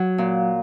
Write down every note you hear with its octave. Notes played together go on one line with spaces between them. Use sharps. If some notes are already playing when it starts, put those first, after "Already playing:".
Already playing: F#3 F#4
A#2